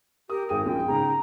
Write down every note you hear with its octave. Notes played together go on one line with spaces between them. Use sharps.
G4 A#4 D#6
G#1 G#4 G5 D#7
A#1 F#2 F4 G5
G#2 C#3 G#4 A#5